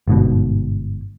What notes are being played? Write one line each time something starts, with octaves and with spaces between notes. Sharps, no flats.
G1 G#2 B2